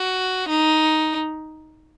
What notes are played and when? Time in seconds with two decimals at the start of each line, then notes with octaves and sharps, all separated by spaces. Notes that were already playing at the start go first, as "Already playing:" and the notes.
Already playing: F#4
0.49 D#4